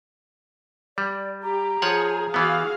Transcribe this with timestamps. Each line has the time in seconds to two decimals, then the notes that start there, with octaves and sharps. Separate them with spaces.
0.98 G3 D5
1.43 G4 A#5
1.82 F3 G#4 C#5 F#5
2.34 E3 B3 F#4 G#4 F5